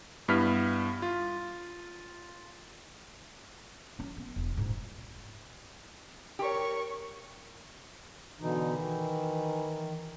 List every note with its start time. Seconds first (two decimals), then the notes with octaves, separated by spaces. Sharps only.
0.28 G2 B3 E4 F6 B6
1.02 F4
3.99 F3 C#4
4.17 B3
4.36 E1 E3
4.57 A#1 G#2
6.39 G4 A#4 C#5 C#6
8.40 B2 D3 E3 D#4
8.74 D#3